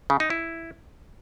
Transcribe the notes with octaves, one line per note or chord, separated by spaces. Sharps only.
C#3
D#4
E4